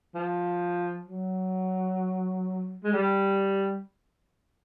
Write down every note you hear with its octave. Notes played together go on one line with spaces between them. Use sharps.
F3
F#3
G#3
G3